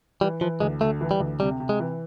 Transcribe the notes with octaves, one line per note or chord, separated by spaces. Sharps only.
E3 G3
E3 F3
D2 G#3
D2 A3
E3
G3
D2
C3 G3
C3
G#3
E3